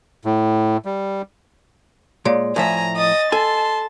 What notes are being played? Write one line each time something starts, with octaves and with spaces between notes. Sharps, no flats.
A2
G3
A#2 G#3 C#5 D5
A2 F3 E5 G#5 A#5
D#5 D#6 A6
A4 G#5 A5 C6